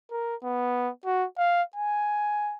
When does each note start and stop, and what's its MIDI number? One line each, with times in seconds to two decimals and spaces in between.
0.11 0.35 70
0.43 0.89 59
1.05 1.25 66
1.38 1.63 77
1.76 2.57 80